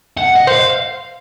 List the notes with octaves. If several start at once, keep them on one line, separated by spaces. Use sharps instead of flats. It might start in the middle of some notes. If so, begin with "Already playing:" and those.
F#5
D#5
C5 F5